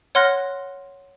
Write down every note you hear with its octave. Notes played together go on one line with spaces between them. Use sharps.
C#5 F#5 C6 F6 F#6 A#6